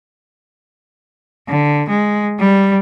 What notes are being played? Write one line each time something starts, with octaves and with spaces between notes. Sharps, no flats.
D3
G#3
G3